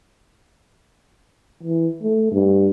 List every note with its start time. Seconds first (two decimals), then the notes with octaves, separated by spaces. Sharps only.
1.63 E3
2.03 A3
2.31 G2